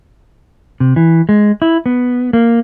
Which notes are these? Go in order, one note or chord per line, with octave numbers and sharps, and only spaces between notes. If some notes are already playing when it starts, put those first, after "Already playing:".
C3
E3
G#3
E4
B3
A#3